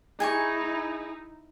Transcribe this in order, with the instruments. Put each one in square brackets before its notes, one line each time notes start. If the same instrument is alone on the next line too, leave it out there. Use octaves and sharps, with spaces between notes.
[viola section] D#4 E4 [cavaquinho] G#4 G#5 C#6